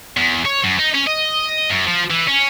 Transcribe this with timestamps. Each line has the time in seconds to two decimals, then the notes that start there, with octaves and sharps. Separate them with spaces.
0.17 E2
0.46 C#5
0.64 F#2
0.79 D#4
0.94 C#4
1.07 D#5
1.70 F#2
1.86 F3
2.10 E3
2.28 C#4